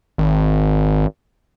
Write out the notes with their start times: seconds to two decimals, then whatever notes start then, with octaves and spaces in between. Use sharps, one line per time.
0.18 G#1